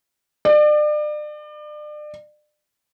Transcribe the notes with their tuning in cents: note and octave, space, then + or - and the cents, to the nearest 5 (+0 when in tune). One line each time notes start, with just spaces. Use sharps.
D5 +35